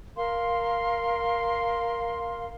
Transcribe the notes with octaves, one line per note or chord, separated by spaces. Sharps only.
A#4 F5 C6